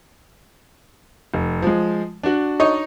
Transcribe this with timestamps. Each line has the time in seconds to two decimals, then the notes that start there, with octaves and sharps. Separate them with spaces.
1.34 F1
1.62 F3 G#3
2.23 D4 F#4
2.60 D#4 C#5 D#5